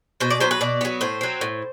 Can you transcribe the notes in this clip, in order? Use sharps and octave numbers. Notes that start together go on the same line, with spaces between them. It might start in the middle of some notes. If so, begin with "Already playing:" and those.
B2 C5
D5
F#3 B3 C5
B4
B2 D5
F#3 B3
A2 C5
F#3 C4
A2